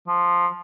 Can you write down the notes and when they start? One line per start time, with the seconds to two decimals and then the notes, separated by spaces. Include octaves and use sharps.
0.08 F3